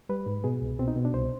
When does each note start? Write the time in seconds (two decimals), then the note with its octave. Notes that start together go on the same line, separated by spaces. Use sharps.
0.09 G3 B4
0.26 G#2
0.44 B2 G#4
0.62 C2
0.79 B2 C4
0.88 D#4
0.96 B2
1.05 D4
1.14 C2 C5